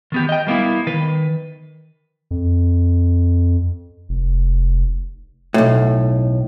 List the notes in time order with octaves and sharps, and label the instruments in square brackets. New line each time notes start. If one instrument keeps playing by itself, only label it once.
[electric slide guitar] D#3 B3 G4
D#5 G5
G3 A#3 B3 E4
D#3 B4
[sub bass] F2
F1
[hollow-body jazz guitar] B1 A2